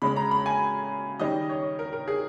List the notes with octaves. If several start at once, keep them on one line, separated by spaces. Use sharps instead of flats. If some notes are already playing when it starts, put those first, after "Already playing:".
C#3 G#3 C#4 B5
A#5
B5
G#5
D#3 G3 C#4 D#5
C#5
A#4
A#4
G#4